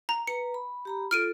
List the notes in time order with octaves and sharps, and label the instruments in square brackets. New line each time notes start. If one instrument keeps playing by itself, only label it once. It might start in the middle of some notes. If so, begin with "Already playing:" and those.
[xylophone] A#5
[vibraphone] B4 A#5 [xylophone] C#7
[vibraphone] B5
G4 A#5 B5
[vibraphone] F4 A4 [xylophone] F6 D7 D#7